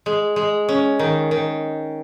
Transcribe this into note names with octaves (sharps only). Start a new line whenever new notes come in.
G#3
G#3
C#4
D#3
D#3